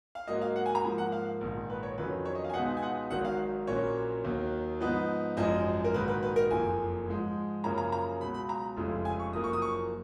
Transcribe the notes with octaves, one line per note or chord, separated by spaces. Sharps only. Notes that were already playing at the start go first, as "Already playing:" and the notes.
F5
G#2 F#3 A#3 D#5
F5
F#5
G#5
A#5
G#2 F3 A#3 G#5
F#5
F5
A#1 G#2 D#3
B4
C#5
F2 D#3 F#3 C#4 B4
C#5
D#5
F5
G#5
C#2 B2 G#3 B3 D#4 F#5
G#5
F#5
G#1 G#2 D#3 F#3 F#5
F5
A#1 A#2 F#3 A#3 C#4 C#5
D#2 D#3 F#3
G#2 F3 B3 D#4 B4
G#1 F#2 F3 G#3 D#5
A#4
A#1 G#2 D#3 F#3 B4
B4
B4
A#4
F#1 F2 F3 A#3 G#5
G#2 F3 G#3
F#2 C#3 F3 A#3 C#4 A#5
A#5
A#5
C#2 B2 F#3 B5
B5
A#5
F1 F2 C#3 F3 G#3
G#5
C#6
F#1 F#2 F3 A#3 D#6
C#6
D#6
C#6